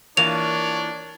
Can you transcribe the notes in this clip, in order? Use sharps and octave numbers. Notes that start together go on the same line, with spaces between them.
E3 A#3 D4 F4 A#4 C#5 F7